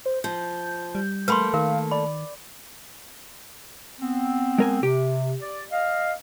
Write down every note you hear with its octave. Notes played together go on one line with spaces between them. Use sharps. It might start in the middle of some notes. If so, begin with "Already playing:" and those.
C5
F3 G6
G3
A3 A#3 B4 B5 C6
D#3 A#4 F5
D5 B5
B3 C4
G#3 A#4 G#5
C3 G4
D5
D#5 F5